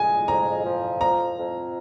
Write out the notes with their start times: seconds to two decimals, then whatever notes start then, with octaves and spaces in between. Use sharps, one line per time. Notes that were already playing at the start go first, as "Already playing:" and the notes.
Already playing: G#3 G#5
0.28 F2 A#5
0.64 F3
1.01 F2 A#5
1.37 F2